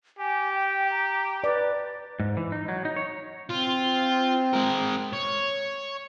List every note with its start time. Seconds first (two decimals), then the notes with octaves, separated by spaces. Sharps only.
0.19 G4 G#5
0.54 G5
0.91 A#5
1.44 B4 D5
2.20 G#2
2.37 E3
2.52 D#4
2.68 F#3
2.85 D#4
2.96 C#5
3.49 C4 F4
4.53 G#3 A#4
5.13 C#5